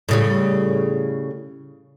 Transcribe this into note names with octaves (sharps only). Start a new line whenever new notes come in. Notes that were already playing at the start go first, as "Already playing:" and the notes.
A2 C#3 G3